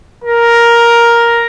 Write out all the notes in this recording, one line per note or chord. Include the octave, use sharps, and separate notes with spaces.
A#4